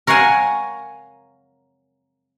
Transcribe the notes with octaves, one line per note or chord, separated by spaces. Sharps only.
A#4 C#5 F5 F#5 G#5